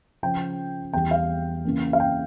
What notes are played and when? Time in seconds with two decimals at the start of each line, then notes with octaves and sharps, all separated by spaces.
0.23 C#3 F3 C#4 G5
0.93 E2 E3 G3 G5
1.11 F5
1.64 C#3 E3 A#3 C#4
1.93 F5
2.00 G5